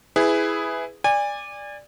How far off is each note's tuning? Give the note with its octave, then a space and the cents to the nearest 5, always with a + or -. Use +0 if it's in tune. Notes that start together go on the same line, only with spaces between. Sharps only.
E4 -5 G#4 +0 B4 +20
D5 +0 G#5 -30